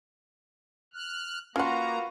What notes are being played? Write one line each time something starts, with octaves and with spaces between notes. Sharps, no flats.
F6 F#6
A#3 C#4 F4 F#4 B4 F#5 A#5 C6